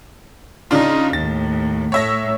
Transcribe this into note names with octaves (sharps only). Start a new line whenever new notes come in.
C#3 D4 D#4 F4
D#2 A2 A6
A2 A3 C#5 E5 A#6